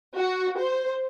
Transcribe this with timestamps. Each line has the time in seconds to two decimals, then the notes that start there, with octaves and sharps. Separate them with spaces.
0.16 F#4
0.59 C5